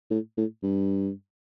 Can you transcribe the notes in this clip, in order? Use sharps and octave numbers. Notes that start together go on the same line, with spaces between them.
A2
A2
G2